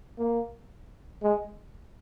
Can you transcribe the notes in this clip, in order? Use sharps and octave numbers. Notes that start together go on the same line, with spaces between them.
A#3
G#3